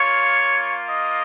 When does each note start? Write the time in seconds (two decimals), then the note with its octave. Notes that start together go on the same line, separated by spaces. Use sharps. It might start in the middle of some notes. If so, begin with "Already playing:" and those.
Already playing: A#3 F4 C#5
0.87 D#5